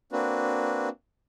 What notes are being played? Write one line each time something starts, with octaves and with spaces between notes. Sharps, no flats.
A#3 C4 D4 F#4 B4